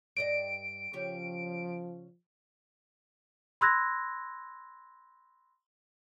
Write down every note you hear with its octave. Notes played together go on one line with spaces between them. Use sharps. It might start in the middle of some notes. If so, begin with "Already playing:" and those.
G2 D5 D#5 D7
C#3 F3 C#4 G4
B5 C6 E6 F#6 G#6 A#6